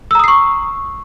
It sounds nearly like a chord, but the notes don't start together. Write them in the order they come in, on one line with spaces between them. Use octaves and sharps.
E6 A#5 D#6 C7 C#6